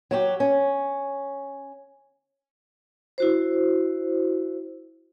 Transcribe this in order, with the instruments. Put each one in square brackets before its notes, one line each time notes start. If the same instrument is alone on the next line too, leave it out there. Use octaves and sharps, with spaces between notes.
[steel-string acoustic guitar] F#3 F#4 G4
C#4
[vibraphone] E4 F#4 C5